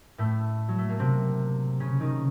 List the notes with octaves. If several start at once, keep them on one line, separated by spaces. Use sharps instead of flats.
A2 A3
F#3
A3
A#3
C3 C4
C#3 C#4
D#3 D#4